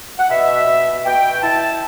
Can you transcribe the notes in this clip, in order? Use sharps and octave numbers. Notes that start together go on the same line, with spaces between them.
F#5
B2 E5
B2
B2 G5
E4 A5